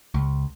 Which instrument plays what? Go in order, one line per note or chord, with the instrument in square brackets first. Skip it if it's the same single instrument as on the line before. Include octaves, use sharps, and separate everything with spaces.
[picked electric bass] C#2